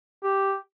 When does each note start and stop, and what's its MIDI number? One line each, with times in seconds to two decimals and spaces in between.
0.23 0.55 67